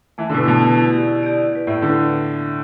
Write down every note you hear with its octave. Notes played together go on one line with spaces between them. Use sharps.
E3 A3
D3
B2 E4 B4
B2 A3
E4 B4
E4
G4 D5
E4
G4 D5
E4
B4 D5
A2 E4
D3 B4 D5